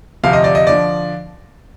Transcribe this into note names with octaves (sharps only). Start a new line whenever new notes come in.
D2 C3 F3 F5
D#5
D5
D#5
D3 F3 D5